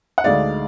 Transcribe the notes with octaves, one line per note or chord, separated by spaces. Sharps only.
F#5
D2 D3 G#3 D#4 D5 F5